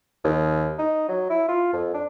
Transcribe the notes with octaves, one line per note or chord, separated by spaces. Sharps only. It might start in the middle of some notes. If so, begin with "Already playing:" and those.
D#2
D#4
F#3
E4
F4
F2
D4